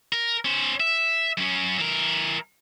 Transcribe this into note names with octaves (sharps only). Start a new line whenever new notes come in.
A#4
C#4 C5
E5
F#2 C#4
E3 A#4